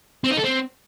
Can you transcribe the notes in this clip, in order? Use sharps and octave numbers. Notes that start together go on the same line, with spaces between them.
C4
D#4
A4
C4